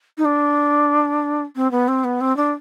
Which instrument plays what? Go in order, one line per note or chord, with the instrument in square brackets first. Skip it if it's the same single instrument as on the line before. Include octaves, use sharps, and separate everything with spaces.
[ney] D#4
D4
C4
B3
C4
B3
C4
D4